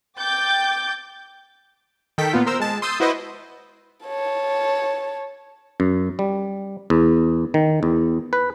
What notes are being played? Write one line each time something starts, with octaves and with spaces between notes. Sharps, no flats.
G5 D6 G6 A6
D#3 A4 G5 B6
A#2 B3 F4
A#4 C5 E6
G#3 A5
C6 D#6 E6 G6 A6 C7
E4 F#4 B4 C5 D#5
C#5 A5
F#2
G3
E2
D#3
E2
B4